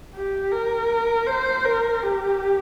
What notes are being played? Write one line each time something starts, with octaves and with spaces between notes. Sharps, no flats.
G4
A#4
C5
A#4
G4